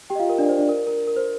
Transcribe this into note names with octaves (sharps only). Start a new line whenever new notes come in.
G4 G5
D#5
F4 F5
A#4
D4 D5
C5
D4 D5
A#4
A#4
A#4
C5